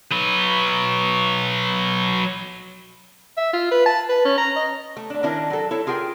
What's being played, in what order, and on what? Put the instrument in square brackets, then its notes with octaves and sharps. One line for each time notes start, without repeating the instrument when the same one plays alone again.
[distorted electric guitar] F#3 B4
[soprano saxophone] E5
F4
B4
A5
B4
C#4
A#5
D#5
[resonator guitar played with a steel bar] A3
A3 D4
D#3 C#4 D4 E4 A#4
F#3 A4
E4 A4 C#5
F4 G#4 A#4 G5